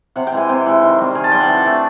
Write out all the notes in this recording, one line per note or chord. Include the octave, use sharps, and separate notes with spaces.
C3 F#5
G5
E3 G#3 G#5
C3 G5
E3 G#3
D#3
G3 C4
D#3 G#5
A5
G3 C4 G5
F#5
E3 G5
F#5
A3 D4